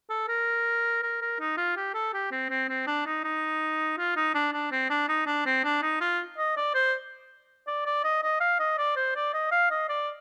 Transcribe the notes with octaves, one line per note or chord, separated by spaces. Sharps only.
A4
A#4
A#4
A#4
D#4
F4
G4
A4
G4
C4
C4
C4
D4
D#4
D#4
F4
D#4
D4
D4
C4
D4
D#4
D4
C4
D4
D#4
F4
D#5
D5
C5
D5
D5
D#5
D#5
F5
D#5
D5
C5
D5
D#5
F5
D#5
D5